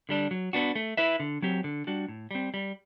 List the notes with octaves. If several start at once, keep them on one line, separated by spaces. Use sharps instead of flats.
D3 G3 D4
F#3
B3 D4 F#4
A3
E4 B4 E5
D3
F#3 C4 G4
D3
G3 D4 F#4
A2
G3 C4
G3